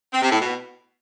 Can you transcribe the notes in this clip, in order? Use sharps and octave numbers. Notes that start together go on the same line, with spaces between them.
C4
C3
A2
B2